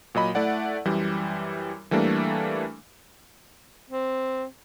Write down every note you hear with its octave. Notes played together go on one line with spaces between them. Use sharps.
A#2 F#3 D#5 B5
A3 E4 D5 F#5
F#2 E3 G3
E3 G3 A3 A#3 D4
C4